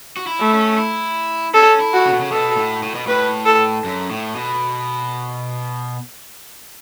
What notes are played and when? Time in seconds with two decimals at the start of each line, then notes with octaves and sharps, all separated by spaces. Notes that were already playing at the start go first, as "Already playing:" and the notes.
0.17 F#4
0.27 E4
0.40 A3
0.53 C#4
0.78 E4
1.54 C#4 A4
1.80 E4
1.93 F#4
2.06 C#3
2.13 B2
2.20 C#3
2.32 B2 A4
2.57 A2
2.83 A2
2.95 B2
3.07 A2 B4
3.46 A4
3.84 F#2
4.10 A2
4.35 B2